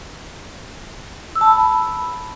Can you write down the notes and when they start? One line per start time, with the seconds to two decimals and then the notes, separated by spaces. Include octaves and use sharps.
1.35 E6
1.41 A5
1.47 B5